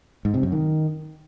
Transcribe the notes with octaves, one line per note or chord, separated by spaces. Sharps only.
G#2
C3
F#2
D#3